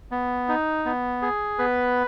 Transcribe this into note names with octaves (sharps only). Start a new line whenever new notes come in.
B3
D#4
B3
G#4
B3 B4